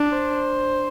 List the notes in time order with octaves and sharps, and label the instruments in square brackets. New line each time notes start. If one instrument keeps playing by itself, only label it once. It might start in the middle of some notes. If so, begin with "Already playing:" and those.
Already playing: [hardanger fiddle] D4
[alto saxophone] C5